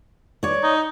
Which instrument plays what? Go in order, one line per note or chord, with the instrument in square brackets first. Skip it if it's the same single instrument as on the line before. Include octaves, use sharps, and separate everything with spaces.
[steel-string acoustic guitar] C#5 D5
[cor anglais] D#4